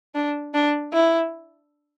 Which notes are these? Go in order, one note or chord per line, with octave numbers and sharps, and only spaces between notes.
D4
D4
E4